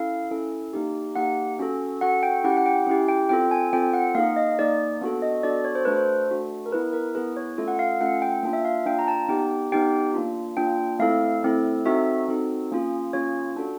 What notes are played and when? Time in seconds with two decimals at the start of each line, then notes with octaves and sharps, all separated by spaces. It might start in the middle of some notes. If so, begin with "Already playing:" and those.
Already playing: C#4 E4 A4 F5
0.31 C#4 E4 A4
0.73 A#3 D#4 G4
1.16 A#3 D#4 G4 F#5
1.59 C#4 F#4 A4
2.01 C#4 F#4 A4 F#5
2.23 G5
2.44 C#4 E4 G4 F#5
2.57 F#5
2.66 G5
2.87 C#4 E4 G4
3.08 G5
3.29 C4 F4 A4 G5
3.51 G#5
3.73 C4 F4 A4 G5
3.93 F#5
4.15 A#3 D#4 G#4 F5
4.36 D#5
4.59 A#3 D#4 G#4 D5
5.01 B3 D4 F#4 A4
5.22 D#5
5.43 B3 D4 F#4 A4 D5
5.65 C#5
5.75 C5
5.85 A3 D4 F#4 A4 B4
5.96 C5
6.30 A3 D4 F#4 A4
6.66 A#4
6.72 B3 E4 G#4 B4
6.93 A#4
7.15 B3 E4 G#4 B4
7.37 C#5
7.58 A3 C#4 F4 A4
7.68 F#5
7.79 F5
8.01 A3 C#4 F4 A4 F#5
8.22 G5
8.43 A#3 D4 F4
8.53 E5
8.65 F5
8.86 A#3 D4 F4 G5
8.99 A#5
9.08 A5
9.28 B3 D#4 G4 G5
9.72 B3 D#4 G4 G5
10.14 A#3 D4 F4
10.57 A#3 D4 F4 G5
10.99 A3 C4 E4 A4 F5
11.43 A3 C4 E4 A4
11.86 C4 D#4 F#4 A4 E5
12.28 C4 D#4 F#4 A4
12.71 A#3 C#4 F4 G#4
13.13 A#3 C#4 F4 G#4 C#5
13.57 D4 F#4 A4